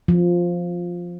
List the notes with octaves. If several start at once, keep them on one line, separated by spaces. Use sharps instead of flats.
F3